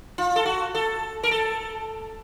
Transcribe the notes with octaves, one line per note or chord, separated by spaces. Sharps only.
F4
A4
F#4
A4
A#4
A4